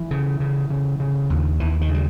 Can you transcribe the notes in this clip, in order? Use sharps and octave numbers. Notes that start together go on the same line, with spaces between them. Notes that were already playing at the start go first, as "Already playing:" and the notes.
Already playing: E3
C#3
C#3
C#3
C#3
D#2
D#2 E3
D#3
C#3
G3